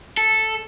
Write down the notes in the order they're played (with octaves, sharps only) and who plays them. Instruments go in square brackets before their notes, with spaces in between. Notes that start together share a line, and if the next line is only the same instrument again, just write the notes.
[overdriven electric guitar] A4